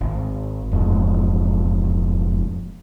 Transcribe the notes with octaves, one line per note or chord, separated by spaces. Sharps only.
G#1
E1 F2 G#2